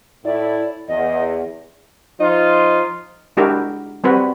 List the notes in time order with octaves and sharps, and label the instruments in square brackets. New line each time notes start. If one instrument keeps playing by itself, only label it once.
[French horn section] A2 E4 [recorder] D5
[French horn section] E2 [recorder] D#5
[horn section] F3 D#4 F4
[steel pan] G#3 D4 E4 F#4 G4 A#4
G3 C4 F#4 B4